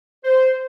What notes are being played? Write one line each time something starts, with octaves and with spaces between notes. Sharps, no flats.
C5